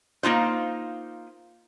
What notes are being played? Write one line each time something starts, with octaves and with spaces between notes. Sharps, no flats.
A#3 D#4 F4 C5